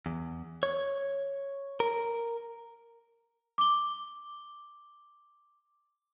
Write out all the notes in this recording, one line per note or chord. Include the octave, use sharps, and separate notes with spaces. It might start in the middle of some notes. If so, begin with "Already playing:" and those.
E2
C#5
A#4
D6 G7